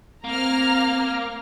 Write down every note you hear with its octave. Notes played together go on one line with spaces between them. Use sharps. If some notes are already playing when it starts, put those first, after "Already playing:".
A#3 C4 A#5 F6